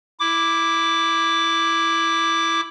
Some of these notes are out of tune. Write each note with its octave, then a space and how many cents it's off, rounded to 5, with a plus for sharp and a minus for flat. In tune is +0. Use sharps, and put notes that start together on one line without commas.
E4 +0 D6 +0